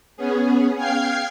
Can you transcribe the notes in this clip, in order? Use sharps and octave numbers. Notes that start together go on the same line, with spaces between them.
B3 C#4 G#4
F5 G5 F6 G#6 C7